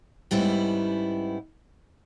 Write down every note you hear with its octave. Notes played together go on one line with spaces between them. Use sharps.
G#2 G3 B3 C#4 E4